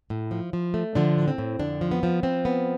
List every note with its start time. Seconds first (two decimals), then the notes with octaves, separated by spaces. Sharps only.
0.10 A2
0.31 F3
0.53 F3
0.74 A3
0.95 D3 F3 D4
1.17 A2
1.28 C4
1.38 A2
1.59 F2 D3 D4
1.81 F3
1.91 B3
2.03 F3
2.23 F3 C4
2.45 B3